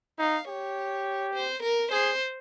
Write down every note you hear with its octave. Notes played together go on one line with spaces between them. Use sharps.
D#4 F5
G4 C#5
C5
A#4
G#4 C5